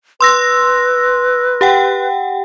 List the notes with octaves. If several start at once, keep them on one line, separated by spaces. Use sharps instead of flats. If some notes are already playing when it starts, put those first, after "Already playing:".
B4 C6 E6 A#6
G4 F#5 G5